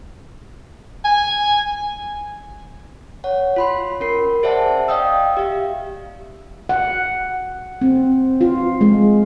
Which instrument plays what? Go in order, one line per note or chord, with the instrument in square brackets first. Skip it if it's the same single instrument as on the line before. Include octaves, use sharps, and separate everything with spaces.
[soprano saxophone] G#5
[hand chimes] C#5 F#5
F4 B5 C6
C#4 A#4 C7
G#4 C5 D5 E5 F#5 A5
D5 D#5 F5 G5 D#6 E6
G4 E5 F5
[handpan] F#5
C4
F4
G#3